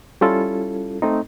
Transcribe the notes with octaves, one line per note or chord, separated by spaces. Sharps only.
G3 C#4 E4 F4 A4
A3 C4 D#4